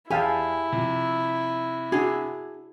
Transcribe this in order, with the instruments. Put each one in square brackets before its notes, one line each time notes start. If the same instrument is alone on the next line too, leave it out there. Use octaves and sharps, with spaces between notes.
[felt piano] E2 [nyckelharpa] E4 [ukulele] G4 G#5 [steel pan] G#4 F5 A5
[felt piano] C3 F3
[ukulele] D4 G#4 [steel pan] F#4